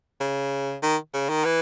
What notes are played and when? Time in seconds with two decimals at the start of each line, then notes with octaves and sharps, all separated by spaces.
0.20 C#3
0.82 D#3
1.14 C#3
1.29 D#3
1.45 E3